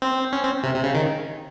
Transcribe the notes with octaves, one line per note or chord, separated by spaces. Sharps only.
C4
C#4
C4
C3
C3
C#3
D#3